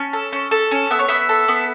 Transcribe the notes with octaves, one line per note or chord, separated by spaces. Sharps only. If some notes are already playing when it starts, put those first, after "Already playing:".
Already playing: C#4 A5
A4
C#4
A4
C#4
B3 E5
C#5
B3 E5
A4
B3